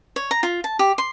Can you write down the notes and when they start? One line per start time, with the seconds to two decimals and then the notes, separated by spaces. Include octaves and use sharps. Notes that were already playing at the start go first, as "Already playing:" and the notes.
0.16 C#5
0.31 A#5
0.43 F4
0.64 A5
0.79 G4
0.98 C6